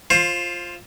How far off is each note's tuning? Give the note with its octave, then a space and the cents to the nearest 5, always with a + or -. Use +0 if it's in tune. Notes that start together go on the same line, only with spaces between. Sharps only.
F4 +0 C5 +20